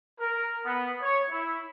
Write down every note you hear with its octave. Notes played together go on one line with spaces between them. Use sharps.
A#4
B3
C#5
E4